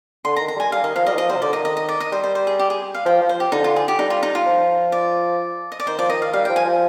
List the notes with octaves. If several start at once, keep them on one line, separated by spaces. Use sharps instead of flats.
D3 C6
A#5
D#3
A#5
G3 G#5
G3 F5
D#3 D#5
F3 F5
G3 D#5
D#3
F3 D#5
G3 C5
C3
D3 D5
D#3 D#5
D#5
D#5
D5
D#5
G3 C5
C5
C5
G#4
G4
G#4
F5
F3 G5
F3
C5
G4
D3 D#4
F4
G#4
G4
G3 D#4
F4
D#4
F4
F3
D5
D#5
D5
D#3 C5
F3 D5
D#3 D#5
F5
G3 F5
F3 G5
G#5
F3